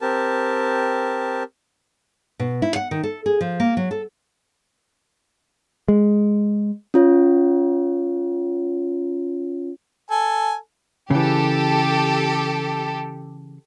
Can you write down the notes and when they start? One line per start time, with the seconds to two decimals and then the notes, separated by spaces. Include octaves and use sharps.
0.01 C4 G4 A#4 A5
2.40 B2
2.62 E4
2.76 F#5
2.91 D#3
3.03 A4
3.26 G#4
3.41 F3
3.60 A#3
3.77 F#3
3.91 A4
5.88 G#3
6.94 C#4 F4 C#5
10.10 A4 G#5
11.10 C#3 E3 G4 A4